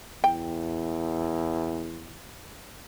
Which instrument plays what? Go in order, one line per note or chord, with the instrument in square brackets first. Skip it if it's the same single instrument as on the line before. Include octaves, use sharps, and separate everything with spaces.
[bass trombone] E2 [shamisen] G5